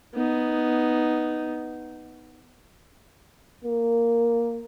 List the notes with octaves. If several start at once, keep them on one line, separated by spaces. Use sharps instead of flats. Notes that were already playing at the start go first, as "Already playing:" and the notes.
B3 D#4
A#3